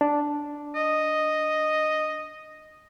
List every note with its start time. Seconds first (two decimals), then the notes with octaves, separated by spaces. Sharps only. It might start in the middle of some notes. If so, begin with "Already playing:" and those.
0.01 D4
0.75 D#5